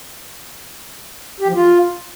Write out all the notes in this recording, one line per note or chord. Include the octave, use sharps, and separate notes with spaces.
G4
F3
F4